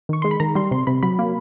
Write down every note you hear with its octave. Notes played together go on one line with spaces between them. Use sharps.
D#3 C#6
G#3 C6
B5
D#3 A#5
G3 C6
C3 C6
C3 B5
F#3 B5
A#3